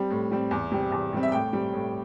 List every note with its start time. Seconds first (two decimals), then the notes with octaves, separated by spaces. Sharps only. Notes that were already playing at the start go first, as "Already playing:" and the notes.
Already playing: G3 C4
0.10 A2
0.31 G3 C4
0.51 E2
0.72 C3 G3 C4
0.92 E2
1.13 C3 G3 C4
1.23 E5
1.32 A2 G5
1.53 G3 C4
1.73 A2